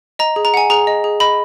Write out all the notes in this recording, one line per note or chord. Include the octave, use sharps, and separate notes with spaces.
D#5 A#5
G#4
A#5
F#5 G#5
G#4 A#5
D#5
G#4
D#5 B5